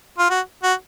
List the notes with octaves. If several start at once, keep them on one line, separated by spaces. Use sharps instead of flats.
F4
F#4
F#4